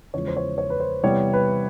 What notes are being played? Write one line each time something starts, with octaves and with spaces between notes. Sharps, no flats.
E2 C#3 F3 G#3 C#5
C5
C#5
C#5
B4
C5
C3 E3 G3 B3 C#5
B4